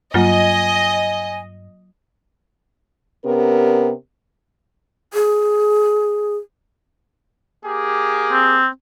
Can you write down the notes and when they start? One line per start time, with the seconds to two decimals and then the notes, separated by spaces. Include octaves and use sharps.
0.14 G2 F#3 A#3 F4 D#5 G#5
3.25 C3 B3 C#4 G4 A#4
5.14 G#4
7.65 A#3 G4 G#4
8.32 C4